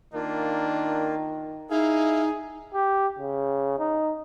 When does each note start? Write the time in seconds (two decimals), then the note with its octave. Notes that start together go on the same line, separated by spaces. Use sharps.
0.14 D#3 A#3 D4 F4
1.70 D#4 E4 G#4 F5
2.74 G4
3.19 C#3
3.79 D#4